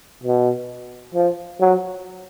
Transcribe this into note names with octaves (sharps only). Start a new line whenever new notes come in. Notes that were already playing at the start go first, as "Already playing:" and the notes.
B2
F3
F#3